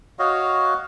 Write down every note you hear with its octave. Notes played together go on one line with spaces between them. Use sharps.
F#4 C#5 D#5 F5